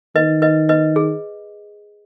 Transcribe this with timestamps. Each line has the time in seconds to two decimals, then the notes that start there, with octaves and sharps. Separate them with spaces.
0.15 D#3 B4 D#5
0.42 B4 D#5
0.69 B4 D#5
0.96 G#4